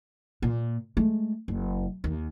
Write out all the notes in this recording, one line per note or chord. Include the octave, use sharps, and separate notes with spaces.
A#2
G#3 A3
F#1
D#2